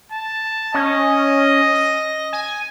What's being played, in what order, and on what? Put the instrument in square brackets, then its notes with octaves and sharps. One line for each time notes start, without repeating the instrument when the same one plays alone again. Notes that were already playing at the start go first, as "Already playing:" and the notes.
[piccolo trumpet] A5
[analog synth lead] C#4 [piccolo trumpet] D#5
[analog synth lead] A#6
G#5